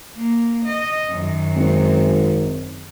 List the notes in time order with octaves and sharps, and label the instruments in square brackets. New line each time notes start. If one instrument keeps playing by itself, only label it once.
[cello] A#3
D#5
F#2 D#3
[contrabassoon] G#1